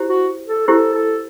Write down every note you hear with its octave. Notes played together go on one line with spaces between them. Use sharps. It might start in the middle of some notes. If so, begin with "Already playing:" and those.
Already playing: E4 G4 C5
F#4
A4
E4 G4 A4 C5
A4